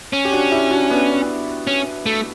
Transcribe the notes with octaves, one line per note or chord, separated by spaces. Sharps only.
C#4
G4
D4 F#4
E4 G4
D4 F#4
B3 D4
C#4
A3